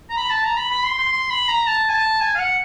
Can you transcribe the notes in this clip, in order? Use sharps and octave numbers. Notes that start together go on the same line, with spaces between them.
A#5
B5
A5
A#5
B5
B5
C6
C6
C6
B5
A#5
A5
G#5
A5
G#5
F5
F#5